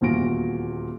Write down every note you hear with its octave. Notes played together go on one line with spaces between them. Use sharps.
D#1 E2 A#2 F#4 A#6 D7